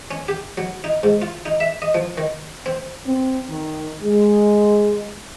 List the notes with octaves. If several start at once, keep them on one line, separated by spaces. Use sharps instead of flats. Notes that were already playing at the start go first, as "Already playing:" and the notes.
C#4
G4
F#3
D#4
G#2
F4
D#4
E5
D#5
F3
D#3
C4
C4
D#3
G#3